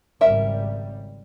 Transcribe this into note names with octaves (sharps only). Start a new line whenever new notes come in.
G#1 C#3 G3 A#4 E5